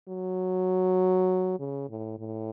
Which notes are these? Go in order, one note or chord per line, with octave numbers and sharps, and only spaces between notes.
F#3
C#3
A2
A2